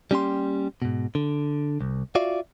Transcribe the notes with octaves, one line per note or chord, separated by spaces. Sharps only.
G3 A#3 C#4 G4 G5 C6
G#2 B2
D3
C2
F4 F#4 D5 E5 F5